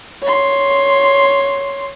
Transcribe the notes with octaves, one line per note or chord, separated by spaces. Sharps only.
C#5 C6